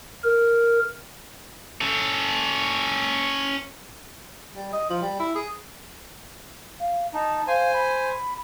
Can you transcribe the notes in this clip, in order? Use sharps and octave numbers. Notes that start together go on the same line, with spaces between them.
A#4
C#4 A4
G3
D#5
F3
G3
E4
G#4
F5
D#4 A5
C5 F5 G#5
B5